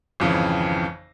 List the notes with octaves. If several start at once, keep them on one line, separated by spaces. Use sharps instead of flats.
G#1 F2 C#3 E3